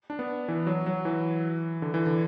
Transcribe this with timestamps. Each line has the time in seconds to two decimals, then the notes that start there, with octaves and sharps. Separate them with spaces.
0.10 D4
0.19 B3
0.48 E3
0.67 F#3
0.86 F#3
1.05 E3
1.82 D3
1.94 E3
2.06 D3